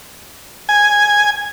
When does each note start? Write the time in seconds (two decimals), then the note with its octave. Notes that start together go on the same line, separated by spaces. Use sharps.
0.69 G#5